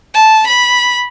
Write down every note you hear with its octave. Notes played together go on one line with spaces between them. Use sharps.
A5
B5